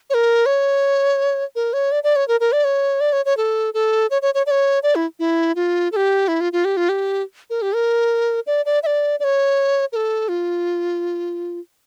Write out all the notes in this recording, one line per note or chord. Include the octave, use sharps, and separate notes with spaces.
C#5
A#4
C#5
A#4
C#5
D5
D5
C#5
A#4
A#4
D5
C#5
D5
C#5
C#5
A4
A4
C#5
C#5
C#5
D5
C#5
D5
E4
E4
F4
A4
G4
E4
F4
F4
G4
F4
G4
A#4
G4
A#4
D5
D5
E5
D5
D5
C#5
A#4
A4
F4